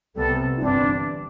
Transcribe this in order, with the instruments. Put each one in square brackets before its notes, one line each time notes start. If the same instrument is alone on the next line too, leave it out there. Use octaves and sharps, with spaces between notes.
[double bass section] C2 C3 G3 B3 [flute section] A4
[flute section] E4
[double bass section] G1 G2 E3 G3 C4 [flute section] D4